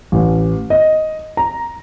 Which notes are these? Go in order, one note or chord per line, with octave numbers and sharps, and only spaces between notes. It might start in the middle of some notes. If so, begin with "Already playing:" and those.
A1
D#5
A#5